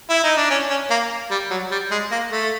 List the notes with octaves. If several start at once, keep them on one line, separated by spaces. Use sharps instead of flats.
E4
D#4
D4
C#4
C#4
A#3
G3
F#3
G3
G#3
A#3
A3